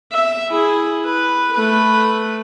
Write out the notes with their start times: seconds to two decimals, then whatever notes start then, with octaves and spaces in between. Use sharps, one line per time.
0.12 E5
0.49 E4 G#4
1.05 B4
1.53 A3 B4